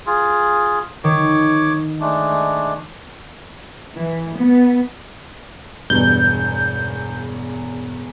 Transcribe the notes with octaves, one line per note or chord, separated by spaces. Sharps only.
F4 G#4
D#3 C#5 D6
G#3 A3 D4
E3
B3
E1 E2 G2 B2 G6